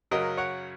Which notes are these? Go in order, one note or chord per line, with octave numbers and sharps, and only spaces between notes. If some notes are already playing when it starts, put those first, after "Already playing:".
F#2 C#3 F#3 A#4 D#5
C#5 F#5